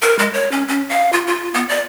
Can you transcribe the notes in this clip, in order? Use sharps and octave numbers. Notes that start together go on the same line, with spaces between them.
A#4
G#3
C#5
C#4
C#4
F5
F4
F4
B3
D5